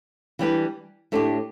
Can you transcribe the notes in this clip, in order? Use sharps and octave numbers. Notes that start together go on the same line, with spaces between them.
E3 G3 D4 G4 B4
A2 A3 D4 G4